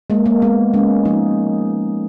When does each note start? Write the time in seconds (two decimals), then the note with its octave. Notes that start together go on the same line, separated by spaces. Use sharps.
0.10 G#3 A#3
0.26 A#3
0.42 G#3 B3
0.74 G#3 C#4
1.05 F3 D#4